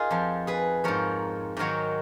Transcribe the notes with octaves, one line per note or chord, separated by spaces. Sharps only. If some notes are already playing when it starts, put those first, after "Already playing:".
Already playing: D#4 F4 G#4 A#4
F2 F3
G#4 B4
G#2 F3 A#4 C#5
G#2 D#3 F#3 A#4 C#5